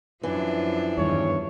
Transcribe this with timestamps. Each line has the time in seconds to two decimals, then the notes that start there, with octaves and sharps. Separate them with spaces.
0.23 F#2 E3 F3 D4
0.98 E2 G2 D#3 C#5